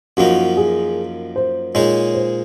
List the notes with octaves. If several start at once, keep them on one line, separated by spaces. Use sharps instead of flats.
F#2 F3 A#3 D#4 F#4
G#4
C5
A#2 G#3 D#4 G#4 C#5
C5